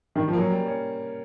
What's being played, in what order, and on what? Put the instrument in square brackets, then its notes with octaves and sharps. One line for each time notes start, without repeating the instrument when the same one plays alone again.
[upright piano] D#3 [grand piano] G3
[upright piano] F3
[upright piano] F#3 [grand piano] A#3 C#4
[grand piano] G3
C#4